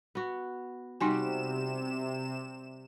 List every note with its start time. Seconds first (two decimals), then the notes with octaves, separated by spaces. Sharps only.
0.15 B3 F#4
1.01 C3 G3 D#4 F#4 G4 G#5 E7